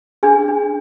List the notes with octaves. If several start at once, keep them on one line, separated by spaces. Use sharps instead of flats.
D4 G#4 G#5
D4